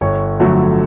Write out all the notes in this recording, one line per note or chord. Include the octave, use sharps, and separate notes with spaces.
G1 C#5
F2 D3 F#3 A3